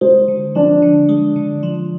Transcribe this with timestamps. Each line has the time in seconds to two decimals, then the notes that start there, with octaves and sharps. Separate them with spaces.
0.01 G#3 C5
0.28 D3
0.55 F3 D4
0.82 D3
1.09 G#3
1.36 D3
1.63 F3